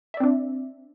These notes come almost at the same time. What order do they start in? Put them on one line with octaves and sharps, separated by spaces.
E5 D5 C4 D4